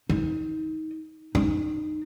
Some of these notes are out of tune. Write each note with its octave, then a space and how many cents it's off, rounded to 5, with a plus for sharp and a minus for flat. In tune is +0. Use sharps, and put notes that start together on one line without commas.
D#4 +20
D#4 -20